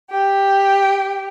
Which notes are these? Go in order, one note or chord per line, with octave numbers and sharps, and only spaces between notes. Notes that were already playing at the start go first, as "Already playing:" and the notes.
G4